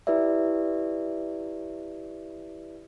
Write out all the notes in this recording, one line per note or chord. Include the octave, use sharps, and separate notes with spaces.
E4 G4 B4 D5 E5